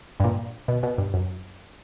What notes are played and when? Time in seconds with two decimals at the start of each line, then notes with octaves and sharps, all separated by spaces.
0.20 G2
0.24 A#2
0.68 B2
0.83 B2
0.98 G2
1.14 F#2